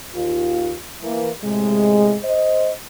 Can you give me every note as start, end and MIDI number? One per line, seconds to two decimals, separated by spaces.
0.14 0.75 39
0.14 0.75 65
1.03 1.29 52
1.03 1.29 58
1.44 2.18 45
1.44 2.18 48
1.44 2.18 56
2.23 2.70 72
2.23 2.70 75